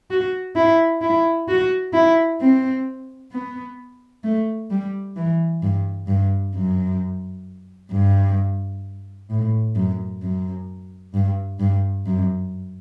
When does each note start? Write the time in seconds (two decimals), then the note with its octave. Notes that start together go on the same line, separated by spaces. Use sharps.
0.11 F#4
0.56 E4
1.02 E4
1.49 F#4
1.94 E4
2.40 C4
3.33 B3
4.24 A3
4.71 G3
5.17 E3
5.63 G2
6.08 G2
6.55 F#2
7.92 G2
9.30 A2
9.76 F#2
10.22 F#2
11.14 G2
11.60 G2
12.07 F#2